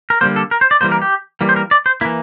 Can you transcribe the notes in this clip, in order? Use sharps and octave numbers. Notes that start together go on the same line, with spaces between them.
A#4
D3 G3 A#3 C5
A4
A#4
C5
D5
E3 G3 A#3 C5
A#4
G4
E3 G3 A#3
C5
A#4
D5
C5
E3 A#3 E4